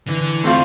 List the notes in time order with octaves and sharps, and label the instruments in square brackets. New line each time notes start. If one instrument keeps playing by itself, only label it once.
[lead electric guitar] D3 [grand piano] E3
[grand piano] A3 C4 F4 A4